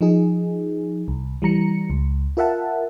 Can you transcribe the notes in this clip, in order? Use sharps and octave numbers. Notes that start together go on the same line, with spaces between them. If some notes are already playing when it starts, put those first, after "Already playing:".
F3 D#4 G#4
C2
E3 G3 A#5 C#7
C#2
F4 A#4 E5 F#5 A5